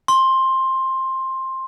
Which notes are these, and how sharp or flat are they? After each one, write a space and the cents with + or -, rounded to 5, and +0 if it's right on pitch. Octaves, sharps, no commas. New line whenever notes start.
C6 +15